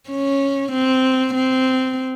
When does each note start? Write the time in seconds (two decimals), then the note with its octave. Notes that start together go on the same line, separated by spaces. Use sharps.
0.10 C#4
0.72 C4
1.35 C4